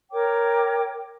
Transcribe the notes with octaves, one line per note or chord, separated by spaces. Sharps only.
A#4 C#5 G5 D6